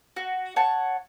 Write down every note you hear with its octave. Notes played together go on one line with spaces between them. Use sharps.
F#4
C#5 F#5 A5